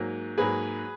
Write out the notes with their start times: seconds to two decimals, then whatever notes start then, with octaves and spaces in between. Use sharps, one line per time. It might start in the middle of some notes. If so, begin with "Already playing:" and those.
Already playing: G#2 F#3 A#3
0.38 G#2 F#3 A#3 G#4 B4